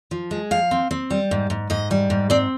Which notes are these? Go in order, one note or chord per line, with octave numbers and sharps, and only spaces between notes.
F3
G#3
F3 F5
C4
C4
G3
G#2
G#2
G#2 D#5
G3
G#2
C4 D5